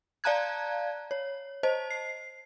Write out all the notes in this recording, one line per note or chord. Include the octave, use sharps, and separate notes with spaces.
D5 F5 A5 A#5 F#6 G#6
C#5
C5 D#5 A5
C7